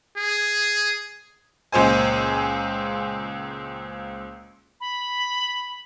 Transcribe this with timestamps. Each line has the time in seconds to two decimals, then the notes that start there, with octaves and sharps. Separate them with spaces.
0.17 G#4
1.72 C#2 A#2 C5 G#5
4.80 B5